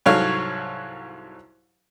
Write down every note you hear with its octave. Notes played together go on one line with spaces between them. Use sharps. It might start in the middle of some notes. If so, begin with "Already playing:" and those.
C2 G#2 F#3 A4 C#5 F5